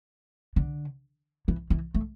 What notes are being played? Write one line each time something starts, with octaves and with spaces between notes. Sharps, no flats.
D3
E3
E3
A3